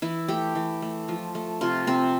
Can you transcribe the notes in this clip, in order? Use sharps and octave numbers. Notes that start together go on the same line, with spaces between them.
E3 E4
A3 G4
E3
A3
F3
A3
C3 F4
C3 C4